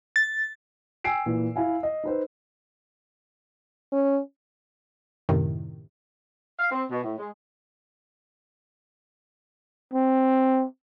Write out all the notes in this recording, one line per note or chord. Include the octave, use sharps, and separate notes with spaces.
A6
G5 G#5 E6 C7 D7
A#2 E3
E4 F5 G#5
D#5
D#4 B4 C5
C#4
F#2 A2 C3 D#3
F5
C4
B2
A2
G#3
C4